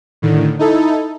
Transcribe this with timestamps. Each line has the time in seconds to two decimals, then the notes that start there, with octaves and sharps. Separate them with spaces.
0.22 A2 D3 D#3
0.59 D#4 E4 A4